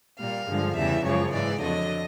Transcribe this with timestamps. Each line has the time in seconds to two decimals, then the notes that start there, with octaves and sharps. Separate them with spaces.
0.19 A#2 G3 F5
0.48 G2 D3 F3 G#3
0.76 E2 C#3 E3 G3 E5
1.04 F#2 C#3 F3 G#3 C#5
1.32 G#2 E3 G#3 D5
1.61 F2 D3 F#3 D#5